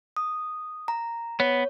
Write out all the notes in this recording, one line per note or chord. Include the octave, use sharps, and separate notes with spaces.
D#6
A#5
B3 C#5